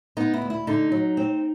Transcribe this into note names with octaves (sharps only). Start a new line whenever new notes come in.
B3 D#4
E4
D2
E4
D3 D#4
F#3
C4